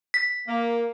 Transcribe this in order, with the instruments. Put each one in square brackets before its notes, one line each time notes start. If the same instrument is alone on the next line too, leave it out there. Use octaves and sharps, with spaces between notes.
[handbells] B6
[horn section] A#3